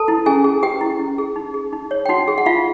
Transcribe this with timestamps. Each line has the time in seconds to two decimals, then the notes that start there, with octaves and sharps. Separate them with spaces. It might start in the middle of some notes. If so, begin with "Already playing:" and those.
Already playing: A4 B4 A5
0.08 E4
0.26 C#4 G#4 G#5
0.44 G#4
0.63 G4 B4 G5
0.81 E4
0.99 C#4
1.18 G#4
1.36 D#4
1.54 G#4
1.73 D#4
1.91 C#5
2.06 G5
2.09 D#4 F#4 F#5
2.28 G#4
2.38 F#5
2.46 D#4 F4 F5